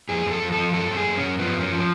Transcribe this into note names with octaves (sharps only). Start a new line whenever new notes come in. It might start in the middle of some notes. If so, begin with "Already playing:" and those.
F2 G#4
F2 A4
F2
A4
F3
F#2 A4
F#2
G#4
F#2
C#4
F#2
F3 B3
F#2
C#4
F3